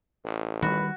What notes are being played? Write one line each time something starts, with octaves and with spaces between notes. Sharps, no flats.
A1
D#3 F#3 G3 F#4 B4